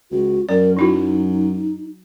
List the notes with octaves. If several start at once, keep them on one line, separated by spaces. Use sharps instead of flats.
C#2 F#4
F#2 A#4 D5
F#3 D#4 E4 F#4